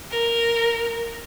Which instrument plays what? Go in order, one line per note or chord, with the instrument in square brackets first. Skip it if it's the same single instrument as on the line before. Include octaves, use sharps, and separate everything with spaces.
[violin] A#4